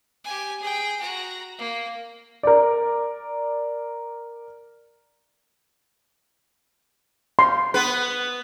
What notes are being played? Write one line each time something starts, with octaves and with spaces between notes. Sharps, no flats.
G4 G#5
G#4 G5
F#4 A#5
A#3
A#4 D5
C6
B3 B4